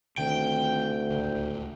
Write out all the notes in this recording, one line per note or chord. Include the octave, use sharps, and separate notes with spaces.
D2 C3 D#3 C4 G5
D1 C#2 D3